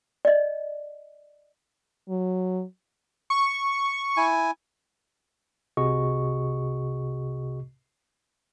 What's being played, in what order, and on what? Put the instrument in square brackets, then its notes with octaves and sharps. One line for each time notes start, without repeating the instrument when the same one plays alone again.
[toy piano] D5 D#5
[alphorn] F#3
[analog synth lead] C#6
[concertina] E4 G#5
[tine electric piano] C2 C3 F#4 G#4 D#5 C#6